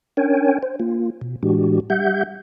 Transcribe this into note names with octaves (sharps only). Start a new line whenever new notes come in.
C#4 D4 A#4 C#5 G5 G#5
C5
A#3 F4
B2
A2 E3 G#3 D4 F#4 G4
G3 G4 E5 F#5 G6